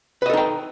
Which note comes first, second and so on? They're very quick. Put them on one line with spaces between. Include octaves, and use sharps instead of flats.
B4 D#5 A4 D#4 G5